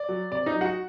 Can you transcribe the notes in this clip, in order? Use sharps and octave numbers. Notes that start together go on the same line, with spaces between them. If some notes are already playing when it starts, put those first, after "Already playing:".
Already playing: D5
F#3
C3 D5
D#4 D#5
F#3
F#4 F#5